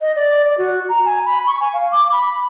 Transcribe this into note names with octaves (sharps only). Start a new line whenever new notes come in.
D#5
D5
D5
F#4
A#5
G#5
B5
C#6
G#5
F5
D6
B5